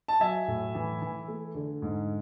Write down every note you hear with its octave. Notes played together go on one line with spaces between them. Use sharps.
A5
F#3 E5 G#5
A2
E3
E3
A3
D3
G#2